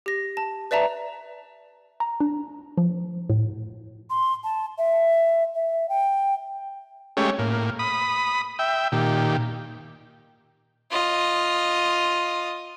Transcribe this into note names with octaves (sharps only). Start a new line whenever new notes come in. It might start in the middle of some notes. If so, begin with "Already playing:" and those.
G4 A#6
A5
B4 D5 E5 A5 A#5
A#5
D4
F3
A2
C6
A5
E5
E5
G5
G#3 A3 C#4 G4 C#5
A2 A#3
B5 D#6
E5 G5
A#2 D#3 G4
F4 D#5